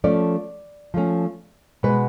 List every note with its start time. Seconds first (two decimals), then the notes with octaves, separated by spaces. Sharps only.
0.04 F3 A3 C#4 D5
0.94 F3 A3 C#4
1.83 B2 G#3 B3 B4